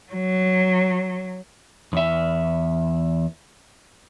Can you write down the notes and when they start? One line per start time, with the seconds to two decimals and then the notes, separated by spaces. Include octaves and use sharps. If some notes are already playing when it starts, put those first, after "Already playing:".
0.12 F#3
1.93 E2 E5